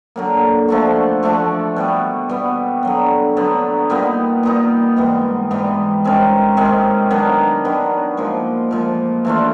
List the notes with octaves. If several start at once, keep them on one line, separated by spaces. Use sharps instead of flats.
D3 F#3 A#3
F3 A3 D4 F#4
F3 A3 D4 F#4
B2 G3 B3
B2 G3 B3
D3 F#3 B3
D3 F#3 B3
A#2 G3 B3 D#4
A#2 G3 B3 D#4
G#2 E3 G3 B3
G#2 E3 G3 B3
C3 D#3 G#3 C#4
C3 D#3 G#3 C#4
D#3 F#3 B3 D4
D#3 F#3 B3 D4
A#2 F3 G#3
A#2 F3 G#3
E3 A3 D4 F4